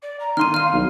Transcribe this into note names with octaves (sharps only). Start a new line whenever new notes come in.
D5
A#5
D#3 C6 F6 D#7
F5 F6 D#7
B1